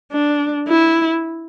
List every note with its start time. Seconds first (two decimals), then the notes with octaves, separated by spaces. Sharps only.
0.12 D4
0.68 E4